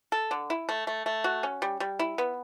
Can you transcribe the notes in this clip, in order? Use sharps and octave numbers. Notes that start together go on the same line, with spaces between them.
A4
D3
E4
A3
A3
A3
F#4
C#4
G3
G3
E4
B3